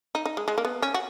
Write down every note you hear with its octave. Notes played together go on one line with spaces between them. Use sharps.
D#4
D#4
G#3
G#3
A#3
B3
C#4
F#4